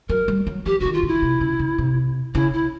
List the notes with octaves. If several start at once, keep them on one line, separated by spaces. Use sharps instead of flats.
F#3 A#4
G3
F#3
F3 G4
D3 F#4
D#3
F4
D3
E4
C3
C#3
C#3
C3
C#3 E4
E4